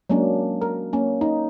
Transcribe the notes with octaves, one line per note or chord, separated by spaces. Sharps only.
F#3 G#3 A#3 C#4 D4
A#4
A#3 C#4
D#4